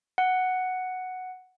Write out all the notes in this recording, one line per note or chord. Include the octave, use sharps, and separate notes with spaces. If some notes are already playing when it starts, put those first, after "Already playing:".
F#5